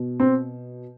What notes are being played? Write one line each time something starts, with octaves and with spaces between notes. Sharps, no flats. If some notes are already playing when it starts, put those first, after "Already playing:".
Already playing: B2
C4